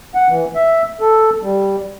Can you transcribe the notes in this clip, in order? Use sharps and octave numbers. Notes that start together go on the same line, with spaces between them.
F#5
E3
E5
A4
G3